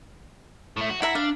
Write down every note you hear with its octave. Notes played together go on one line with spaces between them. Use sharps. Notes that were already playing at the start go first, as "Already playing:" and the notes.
A2 A3
F#4
E4 E5 F#5 A#5
D4 F5